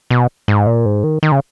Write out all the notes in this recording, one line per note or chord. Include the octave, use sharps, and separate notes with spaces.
B2
G#2
A#2
G#2
D#3
D#3
C#3